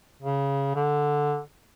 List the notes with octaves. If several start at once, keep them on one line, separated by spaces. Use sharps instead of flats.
C#3
D3